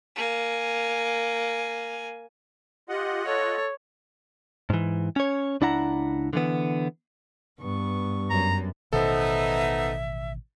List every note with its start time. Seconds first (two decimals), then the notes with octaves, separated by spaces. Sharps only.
0.16 A#3 G#5
2.89 F4 G4 D#5 F#5
3.26 A4 C#5
4.70 G#2 E3
5.16 C#4 C#5
5.61 C#2 D4 E4 F#5 A#5
6.33 D3 E3 B3
7.59 G2 B3 C#6
8.30 F#2 A#5
8.93 A1 B2 D#3 B3 D#4 A4 C5 E5